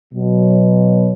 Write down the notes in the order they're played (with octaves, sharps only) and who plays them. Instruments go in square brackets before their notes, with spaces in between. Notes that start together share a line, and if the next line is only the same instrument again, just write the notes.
[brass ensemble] B2 F#3